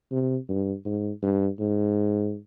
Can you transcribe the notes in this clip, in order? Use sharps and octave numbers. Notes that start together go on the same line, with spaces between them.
C3
G2
G#2
G2
G#2